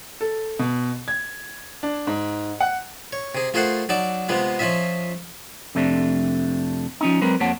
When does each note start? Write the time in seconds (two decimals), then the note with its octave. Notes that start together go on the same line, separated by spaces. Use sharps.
0.21 A4
0.59 B2
1.08 G#6
1.83 D4
2.07 G#2
2.60 F#5
3.13 C#5
3.35 C3 G#4
3.54 A3 F4 G#4 A#4 C5 F#5
3.89 F#3 D#4 D5 A5 D6
4.29 C3 G#3 B3 F4
4.59 F3 C#4 F4 D#5 E5
5.75 F2 C3 A3 D4
7.01 F3 C#4 D#4
7.21 F#3 G#3 C4 A#4 B4
7.40 F2 F3 A#3 C#5 F#5 A5